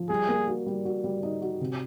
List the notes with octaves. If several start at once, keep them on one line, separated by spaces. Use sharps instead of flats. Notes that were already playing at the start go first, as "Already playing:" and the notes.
Already playing: F3
G3 G#4
A#3
F#4
G3
F#4
G3
D#4
F#4
C3